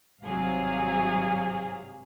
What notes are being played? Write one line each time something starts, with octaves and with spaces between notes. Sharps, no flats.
G#1 G2 C3 F#3 G#4 F5